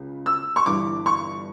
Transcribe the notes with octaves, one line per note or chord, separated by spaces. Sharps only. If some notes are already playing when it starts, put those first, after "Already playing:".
Already playing: C#2 C#3
E6
C#6
G1 G2 E3 D6
C#6